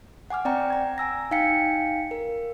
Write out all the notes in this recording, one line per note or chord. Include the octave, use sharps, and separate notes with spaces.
F#5 G#5 D6 F6
C4 D5 F#5 G5 A#5
A#5 G#6
G#5 E6 A#6
D#4 F5 G5 G#5 B6 C#7
A#4